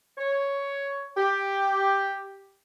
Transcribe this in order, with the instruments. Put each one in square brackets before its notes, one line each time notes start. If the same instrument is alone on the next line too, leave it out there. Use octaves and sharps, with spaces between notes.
[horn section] C#5
G4